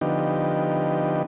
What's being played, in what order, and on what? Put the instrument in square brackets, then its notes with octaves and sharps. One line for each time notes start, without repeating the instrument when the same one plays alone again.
[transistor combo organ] D3 F3 B3 D#4 G4